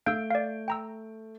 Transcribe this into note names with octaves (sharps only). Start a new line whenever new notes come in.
A3 F5 E6 G6 D7
D5 F5
G5 A#5 E6